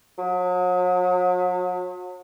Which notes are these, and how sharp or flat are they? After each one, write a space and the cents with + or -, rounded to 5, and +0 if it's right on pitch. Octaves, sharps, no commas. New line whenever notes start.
F#3 -40